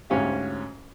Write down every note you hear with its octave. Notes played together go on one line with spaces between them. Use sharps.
D2 G#2 C#4 G4 F5